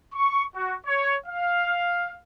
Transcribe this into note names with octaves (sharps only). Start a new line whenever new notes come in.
C#6
F#4
C#5
F5